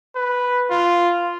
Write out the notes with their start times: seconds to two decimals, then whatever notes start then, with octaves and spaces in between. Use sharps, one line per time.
0.16 B4
0.71 F4